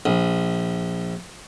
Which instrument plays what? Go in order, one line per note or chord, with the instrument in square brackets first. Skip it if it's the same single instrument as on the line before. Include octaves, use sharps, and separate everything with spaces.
[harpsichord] A#1